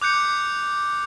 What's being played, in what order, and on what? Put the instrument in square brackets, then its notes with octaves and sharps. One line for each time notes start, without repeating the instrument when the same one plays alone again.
[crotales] D6 F#6 G6 C#7